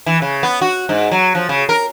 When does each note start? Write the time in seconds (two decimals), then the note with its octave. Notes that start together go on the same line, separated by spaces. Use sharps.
0.06 E3
0.22 C#3
0.43 B3
0.61 F#4
0.89 G#2
1.11 F#3
1.35 F3
1.49 C#3
1.69 A#4